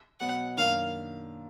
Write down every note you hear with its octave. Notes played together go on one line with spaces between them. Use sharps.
B2 F#3 B3 F#5
F#2 D#3 A#3 D4 F5